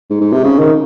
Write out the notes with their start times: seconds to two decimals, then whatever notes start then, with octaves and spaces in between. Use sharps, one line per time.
0.10 G#2
0.21 G#2
0.33 C3
0.44 C#3
0.59 D#3